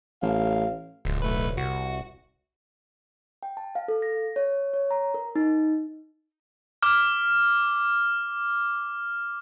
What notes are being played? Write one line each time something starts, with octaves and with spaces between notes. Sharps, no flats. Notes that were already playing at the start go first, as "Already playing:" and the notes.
A1 F5
D1 C#2
B1 A3 B4
C2 F#4
G5
A5
F5
A4
A#6
C#5
C#5
A#5
A#4
D#4
D6 F6